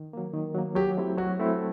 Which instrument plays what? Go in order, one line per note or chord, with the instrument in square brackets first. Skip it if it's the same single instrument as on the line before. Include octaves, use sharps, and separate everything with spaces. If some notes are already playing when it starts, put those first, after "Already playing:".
Already playing: [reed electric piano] D#3
F#3 A#3
D#3
F#3 A#3
[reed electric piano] F#3 [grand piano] G4
[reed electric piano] A3 C4 E4
[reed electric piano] F#3 [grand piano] F#4
[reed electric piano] A3 C4 E4